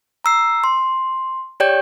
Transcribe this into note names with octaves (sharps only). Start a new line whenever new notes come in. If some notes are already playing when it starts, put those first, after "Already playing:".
A#5 E6 C7
C6
G4 C#5 D5 G5 G6